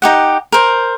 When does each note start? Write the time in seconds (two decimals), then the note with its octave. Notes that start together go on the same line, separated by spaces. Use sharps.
0.02 D#4 G4 F#5
0.52 A#4 C5